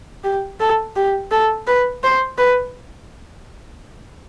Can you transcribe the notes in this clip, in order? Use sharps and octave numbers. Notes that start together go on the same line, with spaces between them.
G4
A4
G4
A4
B4
C5
B4